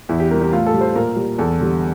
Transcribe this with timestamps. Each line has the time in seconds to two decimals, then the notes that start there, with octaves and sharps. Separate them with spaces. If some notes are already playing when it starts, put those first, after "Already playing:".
0.09 E2 E4
0.20 G4
0.31 C3 G3 A#4
0.41 G4
0.53 A2 F4
0.66 A4
0.74 G3
0.81 C5
0.96 A#2 A#4
1.16 G3
1.38 E2 A4
1.60 D3 G3